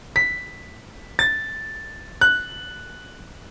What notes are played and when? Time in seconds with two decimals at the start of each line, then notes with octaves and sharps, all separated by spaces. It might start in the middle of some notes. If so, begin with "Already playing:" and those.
0.16 B6
1.19 A6
2.21 F#6